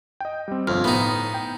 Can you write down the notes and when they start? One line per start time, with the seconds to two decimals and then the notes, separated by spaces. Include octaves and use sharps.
0.20 D#5 G5
0.48 G3 C4
0.68 G1 F2 F5 F6
0.84 A2 B3 D#4
1.34 G5